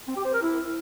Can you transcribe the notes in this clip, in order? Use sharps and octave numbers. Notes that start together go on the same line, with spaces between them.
C4
G4
C5
A#4
E4